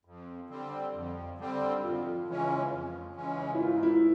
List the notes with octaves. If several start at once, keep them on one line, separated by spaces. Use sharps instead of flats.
F2
D3 G3 C4
F2
D3 G3 C4
F2 F4
C#3 E3 G#3 C#4
F2
C#3 E3 G#3 C#4
E4
G#2 F4
E4